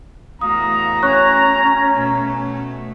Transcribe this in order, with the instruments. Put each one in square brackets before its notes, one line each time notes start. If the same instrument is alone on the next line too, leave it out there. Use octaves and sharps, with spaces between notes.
[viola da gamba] E2 A3 F#4 [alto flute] F5 [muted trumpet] A#5 [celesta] D#6
[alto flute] C#4 [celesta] C#5 C#6 F#6
[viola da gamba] B2 A3